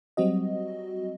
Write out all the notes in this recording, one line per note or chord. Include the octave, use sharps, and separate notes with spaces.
F#3 G3 C4 F#4 D#5